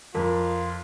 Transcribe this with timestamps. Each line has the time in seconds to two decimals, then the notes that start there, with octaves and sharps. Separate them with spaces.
0.15 F2 F4 A#4